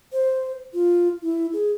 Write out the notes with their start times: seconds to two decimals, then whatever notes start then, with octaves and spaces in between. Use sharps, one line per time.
0.13 C5
0.74 F4
1.23 E4
1.53 G#4